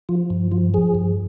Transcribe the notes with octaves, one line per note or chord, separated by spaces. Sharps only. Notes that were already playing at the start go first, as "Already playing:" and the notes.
F3 F4
G2
F3 F4
F3 G#4
G2